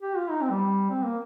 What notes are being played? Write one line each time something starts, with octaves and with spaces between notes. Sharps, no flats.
G4
F4
D#4
C4
G3
C4
A#3